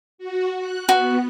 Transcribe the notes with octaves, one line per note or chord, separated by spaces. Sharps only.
F#4
F#6
B3 F#4